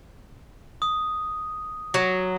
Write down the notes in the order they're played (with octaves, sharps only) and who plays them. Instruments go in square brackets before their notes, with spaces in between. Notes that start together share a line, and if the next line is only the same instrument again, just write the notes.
[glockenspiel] D#6
[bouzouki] F#3